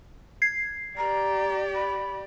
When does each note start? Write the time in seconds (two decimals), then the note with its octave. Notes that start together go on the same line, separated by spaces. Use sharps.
0.42 G#6 C7
0.97 G4 D5 A#5
1.75 B5